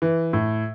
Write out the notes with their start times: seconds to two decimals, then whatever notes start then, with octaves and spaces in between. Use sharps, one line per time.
0.02 E3
0.33 A2